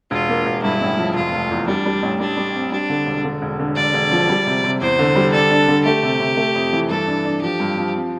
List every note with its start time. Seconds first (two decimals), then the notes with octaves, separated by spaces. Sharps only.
0.11 E1 F4
0.29 A#3
0.46 E1
0.63 G2 E4
0.81 A1
0.98 F3
1.15 F1 F4
1.33 F1
1.50 E2
1.67 G3 D4
1.86 G3
2.03 A1
2.20 G3 D4
2.37 G3
2.55 C4
2.72 G3 D4
2.90 D3
3.06 E1
3.25 D3
3.42 E1
3.59 D3
3.76 E1 D5
3.94 E1
4.11 F3
4.29 G3
4.47 C3
4.64 C3
4.81 E2 C5
4.99 D3
5.16 G3
5.33 D4 A4
5.50 D4
5.68 D3
5.85 A3 G4
6.03 C3
6.20 C3
6.37 A3
6.55 F2
6.73 E3
6.90 G2 A4
7.07 D4
7.25 D4
7.42 F3 G4
7.60 G2
7.77 F3
7.95 C4